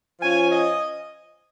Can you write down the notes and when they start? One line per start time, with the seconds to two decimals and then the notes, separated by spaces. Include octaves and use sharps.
0.21 F3 C#4 F4 G#5
0.51 D#5